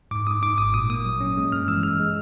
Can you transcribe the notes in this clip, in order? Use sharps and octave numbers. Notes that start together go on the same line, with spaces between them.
G#2 D6
G#2 D#6
G#2 D6
G#1 D#6
A#2 D#6
A#3 D#6
F#3
C#4
G#3
G2 F6
E3 E6
G#3 F6
G#3